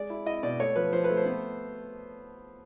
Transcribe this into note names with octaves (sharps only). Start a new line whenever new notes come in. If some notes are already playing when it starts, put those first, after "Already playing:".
Already playing: G#3 D5
E4
E4 D#5
B2 D5
A3 C#5
F3 B4
F3 C5
B4
A3
C5
B3